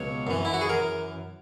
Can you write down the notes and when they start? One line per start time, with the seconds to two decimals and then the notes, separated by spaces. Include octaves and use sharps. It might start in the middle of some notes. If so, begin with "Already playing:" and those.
Already playing: C#2 B2 F#3 C#5
0.27 F#2 E3
0.45 E4
0.53 F#4
0.61 G#4
0.69 A#4